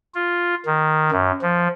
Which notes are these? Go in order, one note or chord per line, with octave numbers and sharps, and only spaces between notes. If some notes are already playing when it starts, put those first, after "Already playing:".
F4
D#3
F#2
F3